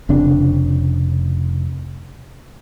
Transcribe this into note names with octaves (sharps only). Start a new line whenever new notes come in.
F1 C#3 C4 D4